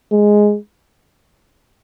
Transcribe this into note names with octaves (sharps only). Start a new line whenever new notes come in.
G#3